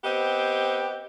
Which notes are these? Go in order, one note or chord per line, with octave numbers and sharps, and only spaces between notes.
B3 C4 G4 D#5